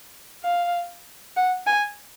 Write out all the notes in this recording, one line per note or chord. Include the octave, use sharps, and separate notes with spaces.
F5
F#5
G#5